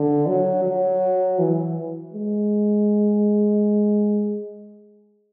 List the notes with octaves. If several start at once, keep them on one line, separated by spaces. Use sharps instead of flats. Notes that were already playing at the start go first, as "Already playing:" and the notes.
Already playing: D3
F#3
F#3
E3
G#3